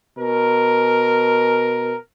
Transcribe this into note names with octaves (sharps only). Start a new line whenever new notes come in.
B2 A#4